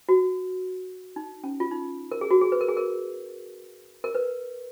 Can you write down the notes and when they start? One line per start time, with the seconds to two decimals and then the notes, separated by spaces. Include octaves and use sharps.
0.09 F#4
1.16 D#4
1.44 C#4
1.60 F4
1.71 D#4
2.11 A#4
2.21 G#4
2.31 F#4
2.41 G#4
2.52 B4
2.61 A#4
2.69 G#4
2.77 A#4
4.04 A#4
4.15 B4